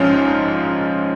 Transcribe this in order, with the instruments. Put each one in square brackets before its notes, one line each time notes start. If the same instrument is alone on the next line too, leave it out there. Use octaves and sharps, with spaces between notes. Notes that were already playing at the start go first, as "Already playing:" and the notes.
Already playing: [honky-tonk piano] A#1 G#2 F3 C#4 D#4 F4